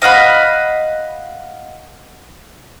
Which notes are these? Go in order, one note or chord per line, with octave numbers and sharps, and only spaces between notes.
D#5 F5 F#5 B5